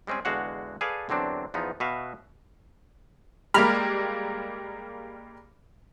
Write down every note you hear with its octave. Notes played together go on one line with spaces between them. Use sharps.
G3 G#3 C4 C#4 G#4
E2 D3 G#3 F#4 F5 F#5
G#4 A4 B4 D5 F5 G#5
E2 D3 F#3 C4 D4
E2 F3 B3 D#4
B2 F#4 B4 E5 F5
G3 G#3 A#3 A#5 B5 F6